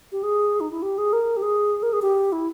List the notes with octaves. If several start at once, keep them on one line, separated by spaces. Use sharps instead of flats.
G4
G#4
D#4
E4
G4
G#4
A#4
G4
G#4
A#4
G#4
G4
E4